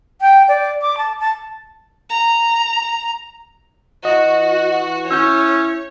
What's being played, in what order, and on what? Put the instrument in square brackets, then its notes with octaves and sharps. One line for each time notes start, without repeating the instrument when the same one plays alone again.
[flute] G5
D5
D6
A5
A5
[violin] A#5
[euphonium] E3 [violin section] F#4 [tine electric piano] D#5
[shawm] C#4 [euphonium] E4 [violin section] C#5 [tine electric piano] E6 G6